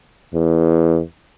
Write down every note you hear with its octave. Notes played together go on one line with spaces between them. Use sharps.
E2